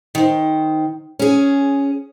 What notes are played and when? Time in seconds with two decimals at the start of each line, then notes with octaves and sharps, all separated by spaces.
0.15 D#3 C5
1.19 C#4 G#4